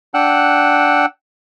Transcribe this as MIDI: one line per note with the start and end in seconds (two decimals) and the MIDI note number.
0.14 1.06 62
0.14 1.06 78
0.14 1.06 79
0.14 1.06 88
0.14 1.06 90